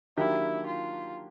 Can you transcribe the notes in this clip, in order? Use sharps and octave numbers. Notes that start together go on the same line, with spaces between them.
D#3 F#3 A#3 D4 E4 G4
F4